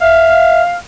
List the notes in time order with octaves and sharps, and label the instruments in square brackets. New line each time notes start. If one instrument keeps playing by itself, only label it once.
[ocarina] E5 [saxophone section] F5